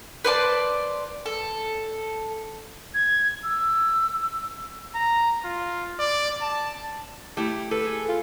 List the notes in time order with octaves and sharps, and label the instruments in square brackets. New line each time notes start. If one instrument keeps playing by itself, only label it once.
[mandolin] B4 C5 D5 A5
A4
[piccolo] G#6
E6
[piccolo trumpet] A#5
F4
D5
A5
[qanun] A3 E4 [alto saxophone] G4
[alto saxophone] A4 [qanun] B4
[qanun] G#4
[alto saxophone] F4